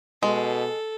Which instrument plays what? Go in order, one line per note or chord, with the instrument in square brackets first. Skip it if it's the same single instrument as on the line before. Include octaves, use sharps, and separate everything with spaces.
[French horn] B2 [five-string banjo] G#3 [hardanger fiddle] A4